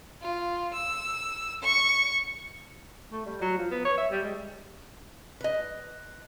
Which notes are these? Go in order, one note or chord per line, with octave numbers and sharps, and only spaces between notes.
F4
E6
C#6
A3
G3
F#3
F3
B3
C#5
E5
G3
G#3
B4 D#5